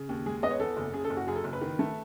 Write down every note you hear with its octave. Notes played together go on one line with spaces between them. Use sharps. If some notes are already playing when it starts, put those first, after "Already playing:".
Already playing: C#3
D#2
G#3 G#4
B3 D#5
C#5
E2 A4
F#1
C#3 G#4
A4
F#1
F#4
F#2 G#4
A4
F#1
B4
D#3
A3